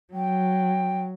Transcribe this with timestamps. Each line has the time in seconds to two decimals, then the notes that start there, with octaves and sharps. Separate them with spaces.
0.14 F#3 G5